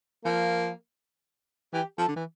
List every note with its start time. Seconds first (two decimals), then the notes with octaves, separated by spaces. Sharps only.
0.25 F3 A#3
1.73 E3 G4
1.98 F3 A4
2.08 D3
2.16 E3